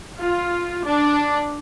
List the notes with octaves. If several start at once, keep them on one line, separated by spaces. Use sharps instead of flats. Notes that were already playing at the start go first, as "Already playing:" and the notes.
F4
D4